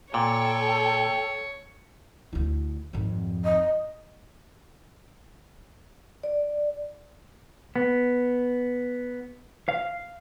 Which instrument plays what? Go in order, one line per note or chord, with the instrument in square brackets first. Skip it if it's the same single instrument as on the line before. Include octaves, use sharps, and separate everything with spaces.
[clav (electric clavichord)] A#2 [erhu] A4 [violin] C#5 [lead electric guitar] G5
[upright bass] D2 E4
G#1 F2
[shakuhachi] D#5
[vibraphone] D5
[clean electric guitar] B3
F5